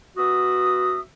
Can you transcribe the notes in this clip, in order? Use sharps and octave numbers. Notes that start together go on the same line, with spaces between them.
B3 F#4 E5 D#6